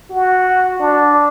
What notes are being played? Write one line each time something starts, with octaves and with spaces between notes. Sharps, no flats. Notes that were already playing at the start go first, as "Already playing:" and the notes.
F#4
D4